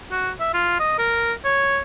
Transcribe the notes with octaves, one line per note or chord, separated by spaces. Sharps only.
F#4
E5
F4
D#5
A#4
C#5